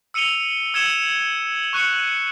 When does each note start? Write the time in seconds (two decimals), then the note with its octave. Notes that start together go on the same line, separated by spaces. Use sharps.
0.14 E6 C#7 D#7 F7 G7
0.74 E6 G#6 C#7 E7 G7
1.56 F#7
1.73 C#6 F#6 G6 C#7